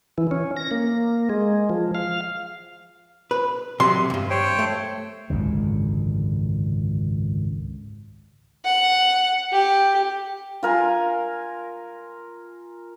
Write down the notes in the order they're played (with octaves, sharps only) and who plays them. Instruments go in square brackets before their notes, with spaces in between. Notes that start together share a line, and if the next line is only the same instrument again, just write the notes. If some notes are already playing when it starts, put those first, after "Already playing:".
[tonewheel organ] E3
C#4
A#6
A#3
G#3
F3
F5
[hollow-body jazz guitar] B4
[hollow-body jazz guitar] C3 F#3 [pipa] C6
[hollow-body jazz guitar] D2 G2
[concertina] C5 C#5 G5
[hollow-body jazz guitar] A3
[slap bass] G#1 C#2 F#2 D3
[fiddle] F#5
G4
[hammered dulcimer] F4 A#4 G#5